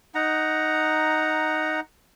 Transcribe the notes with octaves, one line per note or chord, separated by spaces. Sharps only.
D#4 F#5 A#5